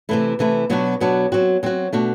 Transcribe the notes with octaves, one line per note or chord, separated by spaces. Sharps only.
C3 E3 A3 E4
C3 E3 A3 E4
B2 F#3 B3 D4 F#4
B2 F#3 B3 D4 F#4
F#3 C4 F#4
F#3 C4 F#4
B2 A3 D4 F#4